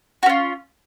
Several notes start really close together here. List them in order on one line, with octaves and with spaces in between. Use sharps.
F#4 C#4 F4